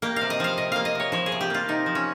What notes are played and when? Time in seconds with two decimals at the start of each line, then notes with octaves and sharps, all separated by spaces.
0.02 A#3 G4
0.16 C3 F5
0.30 D#5
0.40 F3 F5
0.58 C3 D#5
0.72 A#3 F5
0.85 D#5
0.95 C3 C#5
1.12 F3 C#5
1.26 G#4
1.32 C3
1.41 G4
1.50 A#3 F4
1.68 C3 D#4
1.86 F3
1.95 C#4